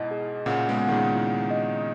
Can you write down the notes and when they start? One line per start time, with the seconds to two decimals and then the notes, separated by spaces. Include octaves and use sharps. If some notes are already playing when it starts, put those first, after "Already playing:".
Already playing: G#2 B2 E4 D#5
0.11 G#4
0.46 A#2 C#3 F#5
0.69 G#3 B3
0.81 F#5
0.88 D#3
0.92 A#2 C#3
1.15 E4
1.51 D#5